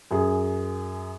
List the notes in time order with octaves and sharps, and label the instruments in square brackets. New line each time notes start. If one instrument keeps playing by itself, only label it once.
[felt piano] F#2 G#4